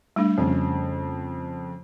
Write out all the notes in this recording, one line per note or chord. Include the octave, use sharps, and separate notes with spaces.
G3 A3 D4
F2 C#3